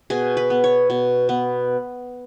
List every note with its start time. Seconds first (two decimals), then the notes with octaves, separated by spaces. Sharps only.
0.10 B2 G#4
0.37 B4
0.50 B3
0.64 C#5
0.90 B2
1.29 B3